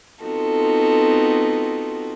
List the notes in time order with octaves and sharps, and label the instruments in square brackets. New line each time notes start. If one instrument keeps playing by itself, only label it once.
[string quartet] B3 C4 D#4 F4 F#4 A4